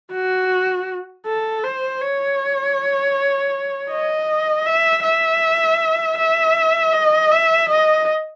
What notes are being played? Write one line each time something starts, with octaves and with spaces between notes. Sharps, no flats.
F#4
A4
C5
C#5
D#5
E5
E5
E5
D#5
E5
D#5